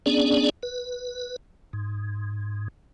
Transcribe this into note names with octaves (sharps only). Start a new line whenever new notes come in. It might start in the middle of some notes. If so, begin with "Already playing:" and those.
B3 C#4 D4 G#4 D5
B4
G#2